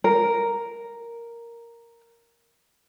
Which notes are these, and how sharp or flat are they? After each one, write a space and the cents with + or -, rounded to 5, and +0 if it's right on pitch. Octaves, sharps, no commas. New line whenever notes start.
A#4 +0